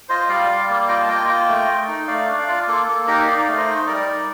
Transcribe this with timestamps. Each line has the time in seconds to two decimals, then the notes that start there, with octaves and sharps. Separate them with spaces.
0.09 F4 C5 D#5
0.29 G3 D5 F5
0.49 G3
0.69 A#3
0.88 F4 D#5 G5
1.03 A5
1.08 A#3 D#5 G5
1.29 F4 D#5 G5
1.48 A3
1.68 A3
1.88 D#4
2.08 A3 D5 F5
2.28 D4
2.38 D5 F5
2.48 F4
2.67 A#3 A4
2.87 A#3 A4
3.07 D#4 G4 A#4
3.27 D#4 D5 F5
3.48 A3
3.57 C5 D#5
3.68 D#4
3.87 G3 A#4 D5
4.06 D#4